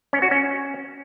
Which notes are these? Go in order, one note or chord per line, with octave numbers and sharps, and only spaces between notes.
C#4
F#4
C#4